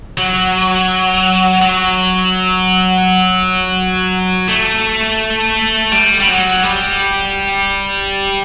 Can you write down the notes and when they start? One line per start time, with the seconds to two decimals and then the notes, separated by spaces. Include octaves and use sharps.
0.18 F#3
1.62 F#3
4.48 A3
5.92 G3
6.20 G3
6.27 F#3
6.63 G3